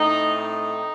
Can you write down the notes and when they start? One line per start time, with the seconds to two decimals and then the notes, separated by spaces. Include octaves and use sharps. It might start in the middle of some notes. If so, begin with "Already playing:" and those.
Already playing: A2 A3 C4 D#4
0.36 D#4